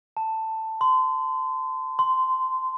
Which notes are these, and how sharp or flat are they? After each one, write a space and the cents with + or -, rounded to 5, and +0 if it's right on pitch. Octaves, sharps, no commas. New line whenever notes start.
A5 +10
C6 -30
C6 -15